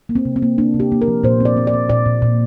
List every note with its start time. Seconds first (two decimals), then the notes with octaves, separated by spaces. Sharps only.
0.09 A#3
0.15 C4
0.25 C3
0.36 C4
0.42 A#3
0.58 A#3 D4
0.74 C3
0.80 G4
0.92 A#3
1.02 A#4
1.08 F3
1.24 A#2 C5
1.40 C4
1.45 D5
1.57 C4
1.67 D5
1.74 C4
1.89 A#2 D5
2.06 A#2
2.22 A#2